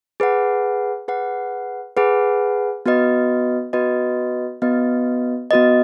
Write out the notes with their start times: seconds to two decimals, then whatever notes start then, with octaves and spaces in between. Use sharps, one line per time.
0.20 G#4 B4 F#5
1.08 G#4 B4 F#5
1.97 G#4 B4 F#5
2.86 B3 F#4 B4 D#5
3.73 B3 F#4 B4 D#5
4.62 B3 F#4 B4 D#5
5.51 B3 F#4 B4 D#5